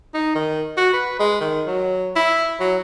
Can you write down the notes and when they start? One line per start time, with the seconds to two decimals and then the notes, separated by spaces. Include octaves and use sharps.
0.14 D#4
0.35 D#3
0.77 F#4
0.93 B4
1.20 G#3
1.41 D#3
1.67 F#3
2.16 E4
2.60 F#3